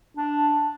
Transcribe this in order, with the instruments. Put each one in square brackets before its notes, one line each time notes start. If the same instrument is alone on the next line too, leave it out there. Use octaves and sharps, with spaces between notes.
[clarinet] D4